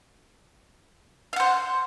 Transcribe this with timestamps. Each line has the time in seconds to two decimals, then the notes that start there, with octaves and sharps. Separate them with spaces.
1.33 F5
1.36 F#5
1.40 C5